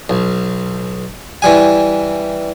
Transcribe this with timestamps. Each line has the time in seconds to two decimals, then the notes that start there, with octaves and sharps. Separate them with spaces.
0.09 B1
1.42 E3 G3 G#5